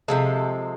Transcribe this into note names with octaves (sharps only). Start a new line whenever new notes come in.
C3 F3 G#3 A4